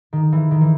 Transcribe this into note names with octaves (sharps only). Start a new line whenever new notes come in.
D#3
E3
D#3
E3